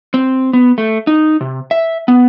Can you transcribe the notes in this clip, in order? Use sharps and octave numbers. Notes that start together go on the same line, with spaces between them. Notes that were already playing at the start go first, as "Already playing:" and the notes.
C4
B3
A3
D#4
C3
E5
B3